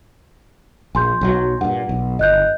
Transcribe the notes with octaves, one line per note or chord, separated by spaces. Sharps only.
A#1 G#5 C6 G6
B1 F3 F#3
G2 A#2 F#5
B1
G1 D#5 F#6 G6